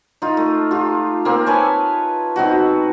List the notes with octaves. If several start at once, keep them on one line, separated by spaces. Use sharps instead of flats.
D#4 F4
A3
F4 G4
A#3 C4
B4 C#5 G#5 A5
B2 C4 D#4 F#4